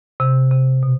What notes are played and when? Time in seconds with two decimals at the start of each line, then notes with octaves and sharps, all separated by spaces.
0.20 C3
0.51 C3
0.83 B2